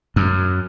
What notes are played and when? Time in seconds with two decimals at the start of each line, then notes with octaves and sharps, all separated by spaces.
0.16 F#2